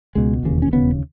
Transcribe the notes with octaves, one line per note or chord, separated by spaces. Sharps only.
C#2 B2 G#3
E1 D#2 C#3
C#4
E1 D#2 C#3 B3